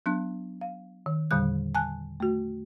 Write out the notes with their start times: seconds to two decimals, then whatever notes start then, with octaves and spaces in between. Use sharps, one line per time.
0.06 F#3 B3 D4 F#6
0.61 F5
1.06 D#3
1.31 E2 A#2 D3 G3 F#6
1.75 G#5 A5 F#6
2.20 A3 F#4